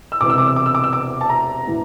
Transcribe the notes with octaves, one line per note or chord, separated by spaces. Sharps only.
E6
E1 E2 C3 D6
E6
D6
E6
D6
E6
D6
E6
D6
A5
A#5
A2 E3